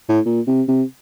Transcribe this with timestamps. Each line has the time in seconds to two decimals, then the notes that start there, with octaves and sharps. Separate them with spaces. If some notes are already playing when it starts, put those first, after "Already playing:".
0.09 A2
0.26 A#2
0.47 C3
0.68 C3